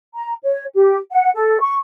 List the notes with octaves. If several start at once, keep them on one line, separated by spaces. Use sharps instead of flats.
A#5
C#5
G4
F#5
A4
C#6